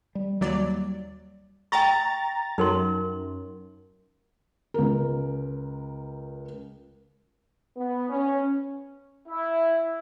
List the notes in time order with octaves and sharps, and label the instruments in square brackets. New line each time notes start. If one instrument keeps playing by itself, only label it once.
[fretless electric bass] G3
[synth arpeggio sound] D#2 F#3 D5 [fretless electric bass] G3
[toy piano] G5 G#5 C#6 [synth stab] A#5 A6
[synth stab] F#2 [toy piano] D#4 A#4 C6
[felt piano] C#2 A#4
[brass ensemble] B3
C#4
[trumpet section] E4